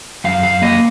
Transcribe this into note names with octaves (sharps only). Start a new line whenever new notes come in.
F#2 F5
F5
A#3 D#5